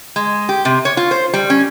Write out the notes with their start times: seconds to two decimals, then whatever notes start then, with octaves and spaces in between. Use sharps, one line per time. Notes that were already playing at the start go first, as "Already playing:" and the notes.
0.16 G#3
0.49 G4
0.65 C3
0.85 C#5
0.97 F4
1.11 C5
1.33 G3
1.50 C#4